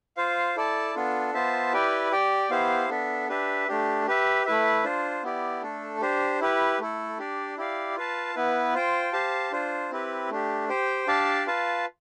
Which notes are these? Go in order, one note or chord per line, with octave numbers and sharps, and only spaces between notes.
F4 C5 F5
E4 A4 D5 A5
B3 D4 F4 A4
B3 F4 C5 E5 A5
E4 G4 B4 D5 G5
G4 D5 G5
B3 E4 G4 C5 F5
B3 D4 A4 E5
D4 G4 B4 E5
A3 D4 G4
G4 B4 E5
A3 E4 B4 E5
D4 F4 C5
B3 E4 G4 D5
A3 D4 A4
D4 G4 C5
E4 G4 B4
A3 E4 A4
D4 G4 D5
E4 G4 D5 F5
F4 B4 F5 A5
B3 E4 B4
F4 C5 G5
G4 C5 F5 A5
D4 F4 C5
C4 E4 G4 B4
A3 D4 G4
G4 C5 G5
D4 G4 D5 F5 A5
F4 B4 F5 A5